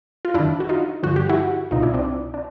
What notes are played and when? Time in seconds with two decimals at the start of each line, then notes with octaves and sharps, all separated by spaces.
0.25 F4
0.34 F#2 D#3 D4 E4
0.60 F#4
0.69 D#4 F4
1.03 G2 D3 F3 F#4
1.16 G4
1.29 E4 F#4
1.71 C2 B2 D#4 F4
1.82 D4 E4
1.94 C4 D4
2.34 D4